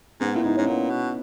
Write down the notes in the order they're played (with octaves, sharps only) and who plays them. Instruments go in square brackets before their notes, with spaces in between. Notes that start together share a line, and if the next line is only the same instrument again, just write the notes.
[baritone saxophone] G#2 [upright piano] B3
[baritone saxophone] A#2 [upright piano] E4
[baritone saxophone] G#2 [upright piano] D#4
[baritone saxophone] G#2 [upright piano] C#4
[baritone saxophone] A#2 [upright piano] B3
[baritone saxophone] B2